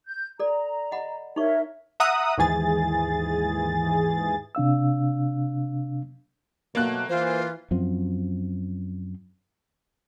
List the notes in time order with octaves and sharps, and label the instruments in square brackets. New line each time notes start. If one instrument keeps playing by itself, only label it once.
[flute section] G6
[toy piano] A4 D5 [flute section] A#5
[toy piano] D#5 F#5 B5
[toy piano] D#4 C#6 [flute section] A#4 C#5 E5
[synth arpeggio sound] E5 F#5 A#5 D#6 E6 F#6
D#2 G#2 E3 G#4 A6
[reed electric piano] C3 D4 F5 E6
[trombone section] B2 F#3 A3 [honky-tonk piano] A#3 F#6
[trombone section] E3 [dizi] F4 [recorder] C5
[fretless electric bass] F#2 F3 C4